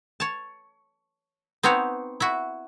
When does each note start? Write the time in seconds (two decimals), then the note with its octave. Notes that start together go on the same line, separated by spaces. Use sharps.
0.20 C#5 A5
1.63 B3 C4 D#4 F#4 C#5
2.20 E4 F#4